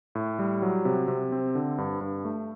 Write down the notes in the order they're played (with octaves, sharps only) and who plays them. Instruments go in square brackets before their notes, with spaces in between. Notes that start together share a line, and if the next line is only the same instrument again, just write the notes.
[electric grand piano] A2
G3
F#3
C3
C3
C4
D3
G2
G2
A3